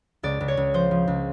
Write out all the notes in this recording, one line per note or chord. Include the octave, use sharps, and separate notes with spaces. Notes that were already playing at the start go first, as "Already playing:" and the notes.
C#2 D5
C#2
C#5
C#2
F3 C5
F3
C#2